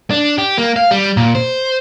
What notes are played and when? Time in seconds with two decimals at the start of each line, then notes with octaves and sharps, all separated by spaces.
0.11 D4
0.38 G4
0.58 A#3
0.76 F5
0.91 G3
1.17 A#2
1.35 C5